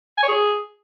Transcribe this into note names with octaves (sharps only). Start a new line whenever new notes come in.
G#5
C#5
G#4